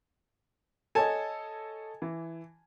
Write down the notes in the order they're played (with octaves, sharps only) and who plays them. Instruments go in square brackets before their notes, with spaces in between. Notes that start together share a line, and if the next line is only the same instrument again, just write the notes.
[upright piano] A4 C#5 D#5 [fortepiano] G#5 A5
[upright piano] E3